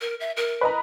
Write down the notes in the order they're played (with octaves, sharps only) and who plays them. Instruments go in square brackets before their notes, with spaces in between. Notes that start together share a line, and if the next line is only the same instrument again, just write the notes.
[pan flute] A#4
E5
A#4
[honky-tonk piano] B4 D#5 A#5